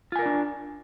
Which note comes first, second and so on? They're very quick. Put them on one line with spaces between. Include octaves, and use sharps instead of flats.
F4 G#5 A#4 D5 D4